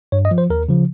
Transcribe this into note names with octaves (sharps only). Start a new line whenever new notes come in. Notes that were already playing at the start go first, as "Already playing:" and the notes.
G2 C#5
D#5
F3
C5
D#2 A#4
C#3 F3